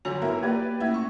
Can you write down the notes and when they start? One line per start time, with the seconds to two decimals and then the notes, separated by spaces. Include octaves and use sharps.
0.05 G1 D3 F#3 F#4 C#5 G#5
0.22 B3 E4 A#4
0.43 A#3 G4 B4 D5
0.80 A3 A#3 C#4 E4
0.94 C#6